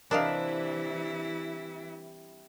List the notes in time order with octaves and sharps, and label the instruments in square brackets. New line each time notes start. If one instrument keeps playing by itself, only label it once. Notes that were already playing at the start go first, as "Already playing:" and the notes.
[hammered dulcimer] C3 G3 [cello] E3 E4 [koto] D4 [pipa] A#4 D#5 F5